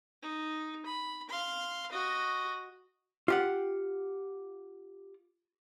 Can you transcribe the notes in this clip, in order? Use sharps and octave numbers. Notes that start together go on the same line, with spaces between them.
D#4
B5
F5 C6
F#4 D#5
F4 G4 F#5